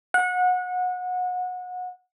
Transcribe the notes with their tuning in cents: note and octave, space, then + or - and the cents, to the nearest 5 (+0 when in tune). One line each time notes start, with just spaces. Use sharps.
F#5 -25